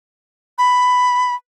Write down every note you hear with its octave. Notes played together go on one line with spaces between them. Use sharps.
B5